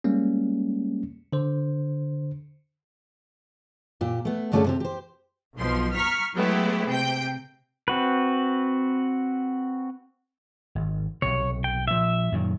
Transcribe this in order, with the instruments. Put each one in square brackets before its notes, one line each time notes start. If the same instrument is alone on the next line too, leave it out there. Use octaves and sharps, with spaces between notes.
[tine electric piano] G3 G#3 A#3 C#4
D3 C5
[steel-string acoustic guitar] A#2 G4
A3 B3
G2 D3 A3 C#4 G#4 A4
C3 C4 G4
G4 C5
[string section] B1 B2 F3 C6
A#5 C#6 F6 B6
F#3 G#3 A3 B3 E4 G4
C3 G5 G6
[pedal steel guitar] C4 F#4 B4
[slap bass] G#1
[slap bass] B1 C3 [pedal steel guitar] C#5
[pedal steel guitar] G5
[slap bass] A#2 F3 [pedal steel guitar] E5
[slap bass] F#2 A#2 D#3